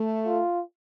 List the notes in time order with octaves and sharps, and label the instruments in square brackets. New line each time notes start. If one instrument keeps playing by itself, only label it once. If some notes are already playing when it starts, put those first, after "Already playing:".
Already playing: [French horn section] A3
[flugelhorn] F4